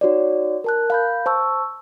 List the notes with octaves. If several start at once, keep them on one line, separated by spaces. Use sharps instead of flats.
D#4 F#4 C#5 D5
A#4 A5 F#6
F5 B5 G6
C5 A5 C#6 E6